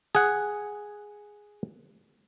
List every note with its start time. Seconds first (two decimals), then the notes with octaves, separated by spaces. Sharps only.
0.15 G#4 F#5